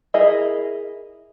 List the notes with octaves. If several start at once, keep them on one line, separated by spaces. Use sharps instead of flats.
E4 G#4 A#4 D#5 E5